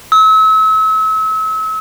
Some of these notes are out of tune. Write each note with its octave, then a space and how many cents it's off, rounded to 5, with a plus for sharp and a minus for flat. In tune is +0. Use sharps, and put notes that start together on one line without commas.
E6 -35